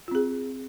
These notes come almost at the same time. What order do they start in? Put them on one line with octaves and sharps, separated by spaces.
F4 C4 G#4